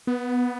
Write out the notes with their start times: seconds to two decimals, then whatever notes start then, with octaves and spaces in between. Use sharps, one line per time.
0.07 B3